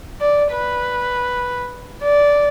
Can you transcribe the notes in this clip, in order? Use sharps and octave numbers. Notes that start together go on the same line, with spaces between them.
D5
B4
D5